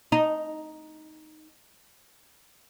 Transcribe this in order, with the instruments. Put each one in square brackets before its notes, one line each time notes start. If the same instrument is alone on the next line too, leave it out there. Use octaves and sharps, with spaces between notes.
[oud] D#4